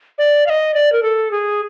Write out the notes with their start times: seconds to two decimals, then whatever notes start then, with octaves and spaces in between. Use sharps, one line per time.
0.18 D5
0.46 F5
0.50 D#5
0.74 D5
0.92 A#4
1.03 A4
1.31 G#4